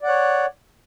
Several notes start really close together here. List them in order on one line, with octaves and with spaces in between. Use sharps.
D5 F#5 C#5